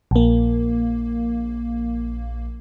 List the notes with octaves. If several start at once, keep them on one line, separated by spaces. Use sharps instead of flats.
A#1 A#3